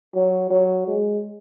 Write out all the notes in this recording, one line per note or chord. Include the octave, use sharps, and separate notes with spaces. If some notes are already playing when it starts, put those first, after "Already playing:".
F#3
F#3
G#3